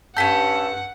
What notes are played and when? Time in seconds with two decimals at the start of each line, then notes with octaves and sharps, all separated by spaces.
0.17 G2 C#4 G4 A4 F#5 G6 B6